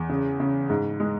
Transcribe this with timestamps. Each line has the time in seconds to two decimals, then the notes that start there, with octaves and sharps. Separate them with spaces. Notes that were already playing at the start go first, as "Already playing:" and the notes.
Already playing: E2
0.09 C#3
0.40 C#3
0.70 G#2
1.00 G#3